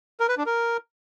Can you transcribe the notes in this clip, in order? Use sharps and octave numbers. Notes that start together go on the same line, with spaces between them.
A#4
B4
D4
A#4